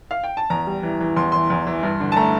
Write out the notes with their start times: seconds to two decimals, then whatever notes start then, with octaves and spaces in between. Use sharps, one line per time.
0.11 F5
0.24 G5
0.37 A5
0.50 E2 A#5
0.67 G3
0.83 E3
1.00 E3
1.16 E2 C6
1.32 E3 C6
1.50 E2
1.67 E3
1.83 G2
2.00 D3
2.12 A5
2.16 A3 A#5